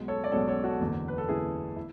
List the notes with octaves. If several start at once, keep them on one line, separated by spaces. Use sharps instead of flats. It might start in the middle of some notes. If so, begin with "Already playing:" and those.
Already playing: B1 B2 G#3
A4 C#5
D5
B1 B2 G#3 A4 C#5
A4 C#5
F#4 A4
F#1 E2 D3
B4
A4
F#1 E2 D3 E4 G#4
E4